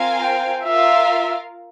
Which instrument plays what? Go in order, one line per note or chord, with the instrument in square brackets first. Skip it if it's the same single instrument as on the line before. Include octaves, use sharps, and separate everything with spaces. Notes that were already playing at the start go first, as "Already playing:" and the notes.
Already playing: [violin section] C4 F4 A#4 F5 G#5
[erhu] G5
[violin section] F4 A#4 F5 [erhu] E5